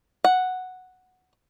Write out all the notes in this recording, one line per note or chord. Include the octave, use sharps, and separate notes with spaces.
F#5